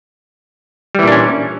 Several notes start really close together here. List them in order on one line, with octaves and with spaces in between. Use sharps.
G3 E3 A#2 D4 C#4